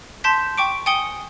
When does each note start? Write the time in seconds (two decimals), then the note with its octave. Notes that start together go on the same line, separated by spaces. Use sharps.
0.24 A5 C6 G6 B6
0.58 G5 C#6 D6 D7
0.86 G5 G#5 D#6 C#7 G7